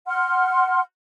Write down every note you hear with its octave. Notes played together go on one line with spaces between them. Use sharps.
F#5 C6 F6